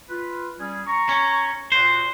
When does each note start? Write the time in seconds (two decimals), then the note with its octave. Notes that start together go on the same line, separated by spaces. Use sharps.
0.09 F4 B4
0.60 G3 C#4 G#4
0.86 A#5 C#6
1.09 C#4
1.72 A#2 F#4 C5